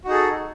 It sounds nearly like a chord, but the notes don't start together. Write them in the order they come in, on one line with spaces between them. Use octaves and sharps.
F#4 D#4 G#4 A4